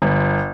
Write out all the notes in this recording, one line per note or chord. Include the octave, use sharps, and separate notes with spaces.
G1